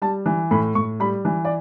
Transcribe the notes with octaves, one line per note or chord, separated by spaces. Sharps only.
G3 A5
E3
A2 B5
A2 C#6
G3 B5
E3
D5